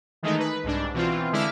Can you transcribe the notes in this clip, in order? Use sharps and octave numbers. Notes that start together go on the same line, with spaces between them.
D#3 E3 G#3 A3 D#4
B4
C2 G#2 D4
B2 E3 C4 F4
D3 G#3 E4 E5 D6 F6